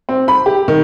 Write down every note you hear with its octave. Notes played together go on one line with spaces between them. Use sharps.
C4
B5
G4
D#3